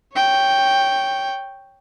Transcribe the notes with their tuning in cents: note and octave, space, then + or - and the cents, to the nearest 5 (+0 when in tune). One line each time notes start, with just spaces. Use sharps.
C#5 +0 G5 +0